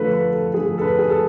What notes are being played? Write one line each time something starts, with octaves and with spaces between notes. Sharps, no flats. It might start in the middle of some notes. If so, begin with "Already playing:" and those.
Already playing: D3 F3 A3 A4 B4
B4
A4
D3 F3 A3 G#4
A4
B4
G#4
A4